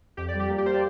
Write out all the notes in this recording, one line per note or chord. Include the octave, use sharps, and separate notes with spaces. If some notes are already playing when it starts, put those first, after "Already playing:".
F2 G4
D5
G3
G4
A#3
G4
A#3 C5
D5